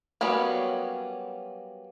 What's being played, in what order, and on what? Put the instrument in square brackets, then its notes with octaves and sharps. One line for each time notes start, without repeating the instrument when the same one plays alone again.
[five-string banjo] F#3 G3 A#3 B3 C#4